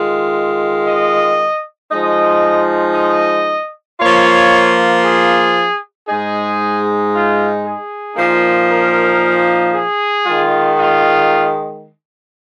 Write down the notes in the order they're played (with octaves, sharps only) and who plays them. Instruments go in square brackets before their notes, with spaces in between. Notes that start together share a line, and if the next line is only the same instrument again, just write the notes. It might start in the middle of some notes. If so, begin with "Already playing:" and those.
Already playing: [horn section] D#3 G#3 F4
D#5
F3 G#3 D#4 D#5
D#5
F3 A#3 F4 C#5
G#4
G#2 G#3 D#4 G#4
F4
G#4
A#2 F3 A#3 D#4
A#4
G#4
D#3 G#3 F4
F4